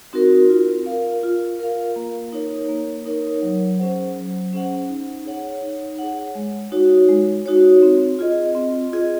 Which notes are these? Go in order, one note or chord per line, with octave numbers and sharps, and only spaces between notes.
C4 D#4 F#4 A#4
F4
A#4 F5
F4
A#4 F5
A#3
D#4 A#4 C#5
A#3
D#4 A#4 C#5
F#3
C#4 G#4 C5 F#5
F#3
C#4 G#4 C5 F#5
D#4
G#4 C#5 F#5
D#4
G#4 C#5 F#5
G#3
D#4 F#4 C#5
G#3
D#4 F#4 C#5
C4
F4 G#4 D#5
C4
F4 G#4 D#5